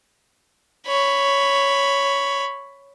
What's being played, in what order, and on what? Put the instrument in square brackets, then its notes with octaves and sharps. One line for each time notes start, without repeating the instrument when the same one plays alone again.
[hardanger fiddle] C#5 B5